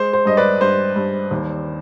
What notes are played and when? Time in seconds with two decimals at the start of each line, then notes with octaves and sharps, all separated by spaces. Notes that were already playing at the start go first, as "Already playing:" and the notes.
Already playing: G#3 C5
0.13 C5
0.25 G2 D#5
0.37 B4 D5
0.60 G2 C5
0.96 G2
1.31 D#2